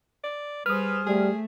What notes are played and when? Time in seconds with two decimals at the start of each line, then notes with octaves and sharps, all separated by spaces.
0.23 D5
0.66 G3 G#4 B4 C5 D#6 F6
1.07 G3 A3 G#4